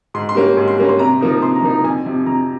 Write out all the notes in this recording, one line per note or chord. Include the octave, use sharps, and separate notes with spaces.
G#2 C6
C6
G3 A#3 C#4
G#2 C6
C6
G3 A#3 C#4
C6
C3 A#5
F3 A#3 D#4
C3 C6
A#5
F3 A#3 D#4
A#5
F2 G#5
C3 F3
F2 A#5